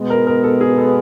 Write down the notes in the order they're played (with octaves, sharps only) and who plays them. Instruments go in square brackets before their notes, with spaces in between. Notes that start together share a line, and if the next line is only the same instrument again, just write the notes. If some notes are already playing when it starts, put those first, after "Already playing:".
Already playing: [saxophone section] B2 G#3 B3
[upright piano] A#4
A#4
A4
G#4
A4